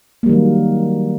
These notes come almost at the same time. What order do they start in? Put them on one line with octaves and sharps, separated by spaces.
A#3 G3 D#3 F#3